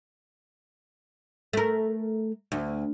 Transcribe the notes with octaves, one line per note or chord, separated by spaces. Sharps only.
A3 A#4
D2